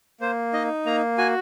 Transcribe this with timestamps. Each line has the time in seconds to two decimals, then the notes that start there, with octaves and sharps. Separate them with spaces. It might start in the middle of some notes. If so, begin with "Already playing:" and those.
0.21 A#3 C5
0.53 D#4 D#5
0.86 A#3 A#5
1.18 F#4 G#5